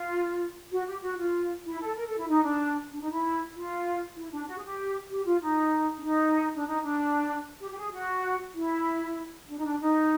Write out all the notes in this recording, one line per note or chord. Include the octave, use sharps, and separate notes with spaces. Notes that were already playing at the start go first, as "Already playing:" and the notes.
Already playing: F4
F#4
G4
F#4
F4
E4
A4
A#4
A4
E4
D#4
D4
D4
D#4
E4
F4
E4
D4
F#4
G#4
G4
G4
F4
D#4
D4
D#4
D4
D#4
D4
G4
G4
G#4
F#4
E4
D4
D#4
D4
D#4